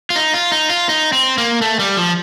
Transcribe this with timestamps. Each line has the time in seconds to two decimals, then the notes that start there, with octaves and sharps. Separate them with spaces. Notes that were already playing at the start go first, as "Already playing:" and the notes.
0.10 F4
0.16 D#4
0.34 F4
0.52 D#4
0.70 F4
0.89 D#4
1.12 C4
1.38 A#3
1.61 A3
1.79 G3
1.97 F3